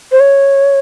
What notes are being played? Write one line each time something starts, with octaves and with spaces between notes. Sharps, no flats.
C5
C#5